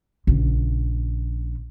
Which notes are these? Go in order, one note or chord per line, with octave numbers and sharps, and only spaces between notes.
A#1 C#3